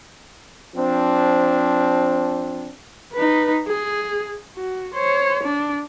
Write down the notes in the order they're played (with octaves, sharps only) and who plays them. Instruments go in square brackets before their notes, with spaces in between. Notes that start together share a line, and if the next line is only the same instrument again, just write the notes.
[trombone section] F3 C4 D4
[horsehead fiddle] D#4 B4
G#4
F#4
C5 C#5
D4